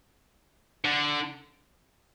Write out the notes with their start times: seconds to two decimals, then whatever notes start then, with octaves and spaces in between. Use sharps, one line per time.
0.85 D3